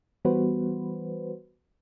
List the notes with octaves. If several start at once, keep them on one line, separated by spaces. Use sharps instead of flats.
E3 G3 B3 F#4 B4 C5